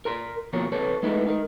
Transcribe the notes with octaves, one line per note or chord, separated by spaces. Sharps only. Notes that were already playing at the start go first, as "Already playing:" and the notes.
A#4 A#5 C6
B2 F3 A#3 A#4 C#5
C3 A4 B4 C#5
G#3 A3 B3 D#4 E4 B4
D#4 A#4